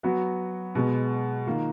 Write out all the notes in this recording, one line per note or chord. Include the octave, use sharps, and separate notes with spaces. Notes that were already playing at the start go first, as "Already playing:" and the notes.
F#3 B3 F#4
B2 G#3 B3
D#3 A#3 F4